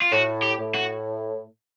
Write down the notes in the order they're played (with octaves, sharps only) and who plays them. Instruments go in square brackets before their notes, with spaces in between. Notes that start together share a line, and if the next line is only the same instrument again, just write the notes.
[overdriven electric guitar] F4
[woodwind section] A2 [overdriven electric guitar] F#4
[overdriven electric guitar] G4
[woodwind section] A2
[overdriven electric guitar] F#4